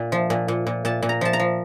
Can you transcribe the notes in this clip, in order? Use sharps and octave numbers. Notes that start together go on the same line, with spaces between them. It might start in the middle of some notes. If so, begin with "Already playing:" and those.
Already playing: A#2
F3
A#2
A#2
A#2
A#2 A5
A#2
A#5
F3 A5
A#5
F3